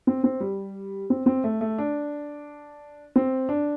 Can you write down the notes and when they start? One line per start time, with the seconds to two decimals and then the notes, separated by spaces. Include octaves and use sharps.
0.07 C4
0.24 C4
0.40 G3
1.10 C4
1.26 C4
1.44 A3
1.61 A3
1.78 D4
3.16 C4
3.49 D4